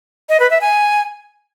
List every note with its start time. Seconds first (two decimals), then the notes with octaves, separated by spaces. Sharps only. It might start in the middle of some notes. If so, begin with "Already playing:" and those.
0.29 D#5
0.40 B4
0.51 E5
0.61 G#5